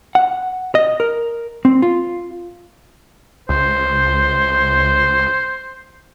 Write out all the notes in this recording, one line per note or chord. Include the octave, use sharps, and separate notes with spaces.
F#5
D#5
A#4
C4
F4
C#2 C5